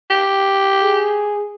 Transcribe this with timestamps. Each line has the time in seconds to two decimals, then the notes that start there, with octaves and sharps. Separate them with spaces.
0.10 G4
0.83 G#4